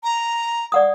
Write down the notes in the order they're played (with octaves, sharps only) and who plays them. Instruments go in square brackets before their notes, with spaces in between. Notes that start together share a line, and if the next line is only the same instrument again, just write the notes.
[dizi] A#5
[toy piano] D5 F#5 D#6